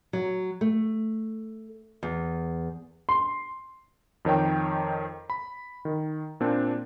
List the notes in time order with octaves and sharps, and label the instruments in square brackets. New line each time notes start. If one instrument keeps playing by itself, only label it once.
[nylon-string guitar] F#3
A3
E2
[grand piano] C6
[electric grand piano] F2 D#3 C#5 G5
B5
D#3
A#2 C4 D4